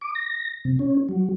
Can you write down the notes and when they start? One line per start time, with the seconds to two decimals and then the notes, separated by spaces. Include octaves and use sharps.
0.01 D6
0.15 A#6
0.65 C3
0.79 C#4
1.09 F#3